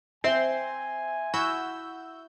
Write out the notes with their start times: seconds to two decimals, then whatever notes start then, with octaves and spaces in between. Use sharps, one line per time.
0.24 C4 C5 E5 G#5 C6
1.34 E4 F#4 E6 G6